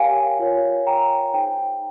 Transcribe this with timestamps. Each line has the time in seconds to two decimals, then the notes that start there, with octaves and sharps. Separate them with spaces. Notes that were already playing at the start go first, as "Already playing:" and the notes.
Already playing: G4 A#4 C#5 F5 G5 G#5
0.39 F4 A#4 C#5
0.87 G5 A#5
1.34 D#4 G#4 C5 G5